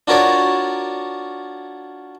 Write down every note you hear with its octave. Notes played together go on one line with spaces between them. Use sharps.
D4 F4 F#4 A#4 C#5 D5